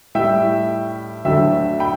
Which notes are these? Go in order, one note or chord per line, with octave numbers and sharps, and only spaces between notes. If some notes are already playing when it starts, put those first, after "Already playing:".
A2 G3 E5 G5
D2 D3 F#3 E5 G5
G5 B5